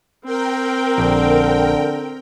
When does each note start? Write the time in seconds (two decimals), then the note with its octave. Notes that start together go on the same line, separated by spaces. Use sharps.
0.25 C4 A#4 G5
0.98 A#1 D3